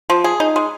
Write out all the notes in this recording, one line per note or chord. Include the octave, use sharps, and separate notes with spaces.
F3
G#4
D#4
G#3